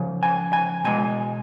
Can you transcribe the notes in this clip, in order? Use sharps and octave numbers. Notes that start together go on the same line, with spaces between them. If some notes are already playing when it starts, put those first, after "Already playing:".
Already playing: C#3 F3
G#5
G#5
B2 G#3 G#5